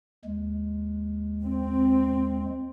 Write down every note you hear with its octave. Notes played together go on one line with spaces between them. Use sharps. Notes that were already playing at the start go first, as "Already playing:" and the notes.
D#2 G#3
C4